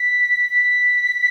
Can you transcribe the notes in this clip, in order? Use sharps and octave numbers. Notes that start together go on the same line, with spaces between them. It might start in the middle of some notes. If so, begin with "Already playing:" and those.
Already playing: B6
B6